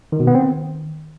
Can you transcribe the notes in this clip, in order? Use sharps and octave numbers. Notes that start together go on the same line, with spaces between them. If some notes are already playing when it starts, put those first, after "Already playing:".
D#3
B2
B3
C4
D#3